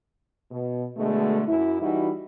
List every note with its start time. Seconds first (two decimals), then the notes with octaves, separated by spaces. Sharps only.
0.51 B2
0.97 B2 D3 G#3 A3
1.48 F#2 E4
1.82 E3 G3 D#4 E4 F#4